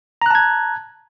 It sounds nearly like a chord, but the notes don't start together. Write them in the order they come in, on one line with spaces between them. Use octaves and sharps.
A#5 F#6 A5 G#6